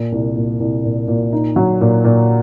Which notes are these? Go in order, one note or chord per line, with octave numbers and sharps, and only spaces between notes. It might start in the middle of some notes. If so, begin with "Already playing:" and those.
Already playing: A#2
C2
A#2
C2
A#2
A#2
D#4
F#3
A#2
A#2